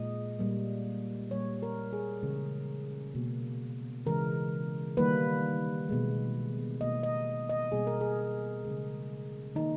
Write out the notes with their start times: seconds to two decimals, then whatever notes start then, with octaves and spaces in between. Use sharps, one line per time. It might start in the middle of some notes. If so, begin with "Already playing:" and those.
Already playing: A#2 G#3 D#5
0.39 A#2 G3 A#3
1.31 A#2 G3 A#3 C#5
1.63 A#4
1.93 G#4
2.23 C#3 E3 G#3
3.15 B2 A#3
4.06 C#3 E3 G#3 A#4
4.97 D#3 G3 A#3 B4
5.89 B2 G#3
6.81 B2 A#3 D#5
7.03 D#5
7.49 D#5
7.72 B2 G3 A#3 G#4
7.87 A#4
8.01 G#4
8.65 C#3 E3 G#3
9.55 D#3 A#3 D#4